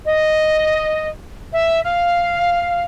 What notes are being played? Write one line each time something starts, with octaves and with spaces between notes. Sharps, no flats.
D#5
E5
F5